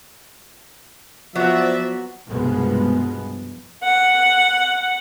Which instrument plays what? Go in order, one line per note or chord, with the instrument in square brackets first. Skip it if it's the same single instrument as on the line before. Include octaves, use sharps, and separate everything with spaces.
[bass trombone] F3 [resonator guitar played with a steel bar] F#3 B3 [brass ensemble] C5 D5 E5
[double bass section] C2 G2 B2 F3 G#3 B3
[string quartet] F#5